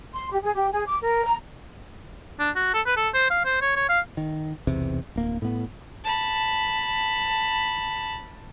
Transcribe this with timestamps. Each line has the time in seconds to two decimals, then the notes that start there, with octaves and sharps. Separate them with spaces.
0.14 C6
0.31 G4
0.43 G#4
0.54 G4
0.71 G#4
0.87 D6
1.02 A#4
1.26 A#5
2.39 D4
2.56 F#4
2.74 A4
2.86 B4
2.97 A4
3.14 C5
3.30 F5
3.45 C5
3.61 C#5
3.76 C#5
3.89 F5
4.17 D#3
4.67 B1 E2 C3
5.16 D1 A#3
5.42 A2 B3
6.04 A5 B5